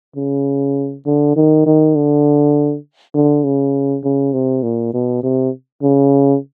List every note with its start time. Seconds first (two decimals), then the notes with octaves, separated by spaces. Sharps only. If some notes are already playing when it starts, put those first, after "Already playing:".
0.16 C#3
1.06 D3
1.36 D#3
1.66 D#3
1.96 D3
3.14 D3
3.44 C#3
4.04 C#3
4.33 C3
4.63 A#2
4.93 B2
5.23 C3
5.83 C#3